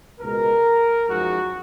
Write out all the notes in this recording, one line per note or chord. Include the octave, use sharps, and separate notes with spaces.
C#2 B2 G#3 A#4
F#2 F3 G#3 D#4 F#4